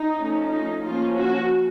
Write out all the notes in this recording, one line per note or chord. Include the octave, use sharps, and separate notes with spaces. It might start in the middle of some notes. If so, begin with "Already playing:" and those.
Already playing: D#4
F3 A3 C#4
D#4
F3 A#3 C#4 F4
F#4